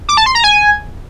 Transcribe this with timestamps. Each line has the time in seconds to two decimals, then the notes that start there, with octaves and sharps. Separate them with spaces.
0.09 D6
0.17 A5
0.26 C6
0.35 A#5
0.44 G#5